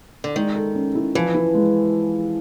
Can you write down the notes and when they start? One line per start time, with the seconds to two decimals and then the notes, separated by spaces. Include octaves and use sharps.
0.24 D3
0.36 D#3 G#3
0.56 A4
0.75 C#4
0.95 E4
1.15 E3 F3
1.35 E4
1.54 G#3